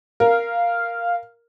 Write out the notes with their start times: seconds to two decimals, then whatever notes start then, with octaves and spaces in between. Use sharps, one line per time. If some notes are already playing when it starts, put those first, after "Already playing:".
0.20 A#4 F5